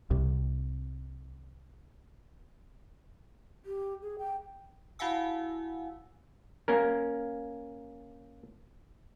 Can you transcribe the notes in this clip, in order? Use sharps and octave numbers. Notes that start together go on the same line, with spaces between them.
C2 C3
G4
G#4
G5
E4 F#4 F5 F#5 G#5 E6
A#3 C#4 A#4